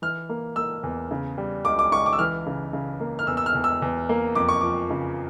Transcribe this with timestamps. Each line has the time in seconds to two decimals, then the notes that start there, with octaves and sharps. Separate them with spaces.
0.02 E3 F6
0.29 A#3
0.56 A#3 E6
0.83 E2
1.11 C#3
1.38 G3
1.65 C#2 D6
1.79 D6
1.92 C#2 C#6
2.06 D6
2.13 E6
2.19 E3 F6
2.46 C#3
2.73 C#3
3.00 A#3
3.19 F6
3.27 E2 E6
3.37 E6
3.46 F6
3.55 E2
3.64 E6
3.82 E2
4.09 A#3
4.35 F2 D6
4.49 C#6
4.61 F3 D6
4.90 C#3